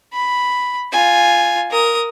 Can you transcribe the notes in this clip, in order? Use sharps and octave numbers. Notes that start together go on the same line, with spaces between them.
B5
F4 G#5
A#4 D#6